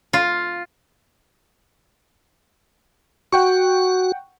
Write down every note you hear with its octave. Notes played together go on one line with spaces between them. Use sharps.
F4
F#4 F#5 G5 C#6